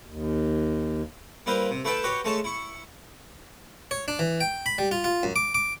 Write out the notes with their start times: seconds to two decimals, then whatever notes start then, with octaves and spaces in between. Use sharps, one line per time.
0.07 D#2
1.46 G3 A#3 E4 B4 C5 F5
1.71 C3
1.85 A3 E4 B4 E5 G5 A5
2.04 F#4 G4 B4 C#5
2.25 G#3 A3 A4 C#5 A5
2.44 E4 C#6
3.91 C#5
4.08 D4
4.19 E3
4.41 G5
4.66 B5
4.78 G3
4.91 F4
5.04 F4
5.23 F#2
5.36 D6
5.54 D6